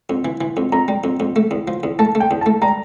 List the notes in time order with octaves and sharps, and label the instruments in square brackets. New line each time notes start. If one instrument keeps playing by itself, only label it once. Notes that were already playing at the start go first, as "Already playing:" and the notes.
[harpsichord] F2
E3
E3
F2
[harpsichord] F2 [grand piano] A#5
[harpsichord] G3
F2
F2
A3
E2
F3
E2
[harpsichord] A3 [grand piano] A5
[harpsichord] A3
[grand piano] G5
[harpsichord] E2
[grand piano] A5
[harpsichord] A3
[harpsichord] G3 [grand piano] A#5